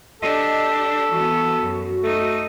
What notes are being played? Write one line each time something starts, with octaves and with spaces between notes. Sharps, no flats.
D4 G4 A4 D#5
E3 B3 F#4
F#2
A3 D#4